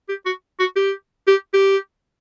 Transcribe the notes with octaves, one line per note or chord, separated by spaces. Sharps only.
G4
F#4
F#4
G4
G4
G4